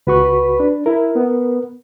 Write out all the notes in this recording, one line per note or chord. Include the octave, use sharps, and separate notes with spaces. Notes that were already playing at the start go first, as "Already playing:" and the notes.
C#2 F#4 B4 C#6
D4
E4 A#4
B3